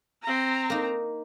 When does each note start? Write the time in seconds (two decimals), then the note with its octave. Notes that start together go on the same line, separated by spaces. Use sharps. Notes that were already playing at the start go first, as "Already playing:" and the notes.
0.23 C4 A#5
0.70 A#3 D#4